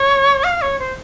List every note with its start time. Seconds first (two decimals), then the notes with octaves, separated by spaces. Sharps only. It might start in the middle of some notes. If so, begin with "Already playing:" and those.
Already playing: C#5
0.44 F5
0.62 C#5
0.79 C5